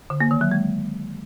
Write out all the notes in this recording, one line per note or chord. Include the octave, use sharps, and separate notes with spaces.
D3
A#3
D#3
F#3
G#3